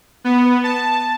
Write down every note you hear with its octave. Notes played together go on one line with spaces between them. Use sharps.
B3
A5